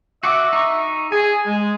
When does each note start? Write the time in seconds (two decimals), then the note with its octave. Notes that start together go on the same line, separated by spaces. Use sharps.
0.23 F#4 E5 F#5 D6
0.53 D#4 C#6
1.12 G#4 G#5
1.46 G#3